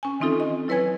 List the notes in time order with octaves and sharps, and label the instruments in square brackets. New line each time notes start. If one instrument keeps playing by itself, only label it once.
[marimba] C#4 G#5
D#3 E3 C4 D#4 F4 A4
D#5
F#3 E4 B4 C#5 G#5 G#6